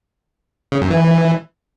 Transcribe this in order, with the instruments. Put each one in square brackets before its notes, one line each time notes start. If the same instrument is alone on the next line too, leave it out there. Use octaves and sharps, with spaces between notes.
[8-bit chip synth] C#3
F#2
E3